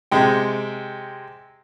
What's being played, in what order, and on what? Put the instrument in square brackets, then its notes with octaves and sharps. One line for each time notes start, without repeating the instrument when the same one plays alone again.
[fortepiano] C3 G#3 G5